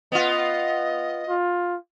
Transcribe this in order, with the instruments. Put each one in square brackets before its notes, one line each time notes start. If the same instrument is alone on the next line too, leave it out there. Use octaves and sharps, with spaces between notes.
[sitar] B3 F4 [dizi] D#5
[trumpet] F4